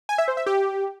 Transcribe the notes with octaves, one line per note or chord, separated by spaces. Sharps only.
G#5
E5
C5
E5
G4